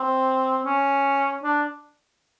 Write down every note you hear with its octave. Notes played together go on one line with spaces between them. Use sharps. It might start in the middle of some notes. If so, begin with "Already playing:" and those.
Already playing: C4
C#4
D4